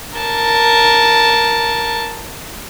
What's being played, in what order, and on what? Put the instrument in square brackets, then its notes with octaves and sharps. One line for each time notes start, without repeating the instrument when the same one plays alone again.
[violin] A#4 A5